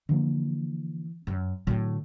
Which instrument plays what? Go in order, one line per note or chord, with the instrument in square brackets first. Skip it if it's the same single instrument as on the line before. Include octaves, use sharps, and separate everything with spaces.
[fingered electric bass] D3 F3 A#3 [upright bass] E3
[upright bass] F#2
[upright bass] A2 D3 [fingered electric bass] F#3